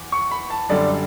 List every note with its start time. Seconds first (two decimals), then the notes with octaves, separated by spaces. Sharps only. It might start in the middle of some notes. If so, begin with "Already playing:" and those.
Already playing: E2
0.12 C#6
0.31 B5
0.50 A5
0.69 F#2 D3 G3 D5